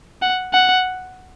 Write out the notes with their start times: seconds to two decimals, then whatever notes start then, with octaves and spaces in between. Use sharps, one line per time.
0.22 F#5
0.53 F#5